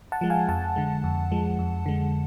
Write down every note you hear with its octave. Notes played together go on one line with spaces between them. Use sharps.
F#5 A5
F3 G#3
F5 G#5
F2 F#5 A5
D3 G#3
F2
F3 G#3
F2
D3 G#3